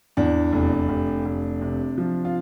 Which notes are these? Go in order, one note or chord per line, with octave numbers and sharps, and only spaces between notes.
E2 D4
F1
F1
F1
C3
F3
F4